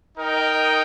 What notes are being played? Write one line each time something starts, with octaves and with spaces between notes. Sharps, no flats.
D#4 A#4 D#5 G5